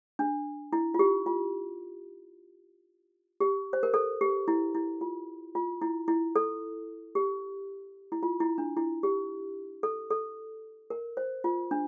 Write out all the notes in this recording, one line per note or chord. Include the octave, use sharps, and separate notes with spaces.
D4
E4
F4
G4
F4
G4
C5
A#4
A4
G4
E4
E4
F4
F4
E4
E4
A4
G4
E4
F4
E4
D4
E4
G4
A4
A4
A#4
C5
F4
D4